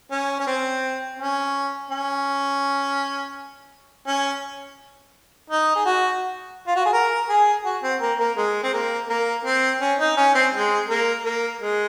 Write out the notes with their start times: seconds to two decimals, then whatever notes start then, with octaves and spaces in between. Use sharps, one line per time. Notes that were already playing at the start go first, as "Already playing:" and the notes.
0.11 C#4
0.40 C#4
0.47 C4
1.19 C#4
1.91 C#4
4.07 C#4
5.50 D#4
5.75 G#4
5.86 F#4
6.67 F4
6.76 F#4
6.86 G#4
6.93 A#4
7.29 G#4
7.65 F#4
7.83 C4
8.01 A#3
8.19 A#3
8.37 G#3
8.63 C4
8.73 A#3
9.09 A#3
9.45 C4
9.81 C#4
9.99 D#4
10.17 C#4
10.35 C4
10.53 G#3
10.89 A#3
11.25 A#3
11.61 G#3